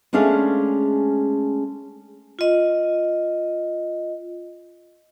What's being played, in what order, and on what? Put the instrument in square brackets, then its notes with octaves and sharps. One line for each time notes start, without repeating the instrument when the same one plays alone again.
[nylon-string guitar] G#3 A3 C#4 D4 G#4 F5
[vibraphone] F4 D#5